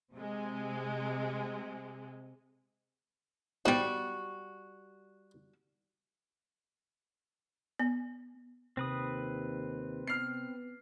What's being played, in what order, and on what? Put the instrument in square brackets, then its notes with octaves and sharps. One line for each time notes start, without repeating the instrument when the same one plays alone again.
[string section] C3 G#3
[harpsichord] G#2 B2 E3 [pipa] G3 F#4
[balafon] B3
[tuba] D#2 [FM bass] C3 [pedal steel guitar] C4 B4 D#6
[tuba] B3 [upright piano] F6 C7